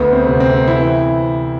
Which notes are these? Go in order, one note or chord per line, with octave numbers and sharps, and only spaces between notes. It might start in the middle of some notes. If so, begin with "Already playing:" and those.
Already playing: D2 B3
C4
C3
C4
E3 E4